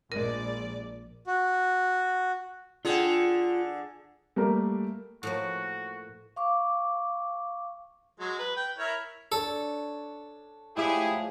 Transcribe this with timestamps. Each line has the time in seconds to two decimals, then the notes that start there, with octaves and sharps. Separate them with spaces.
0.12 A#1 G#3 A#4 D5 D#7
1.27 F#4
2.85 D3 F4 G#4 G5
4.36 G3 A3 A#3 A#4
5.23 A2 F3 A#3 F#4
6.36 F5 C#6 D6
8.20 F#3 G#3
8.39 B4
8.57 G5
8.79 E4 A#4 C#5
9.32 D4 A4 C#5
10.77 A2 F3 G#3 E4 G4 G#4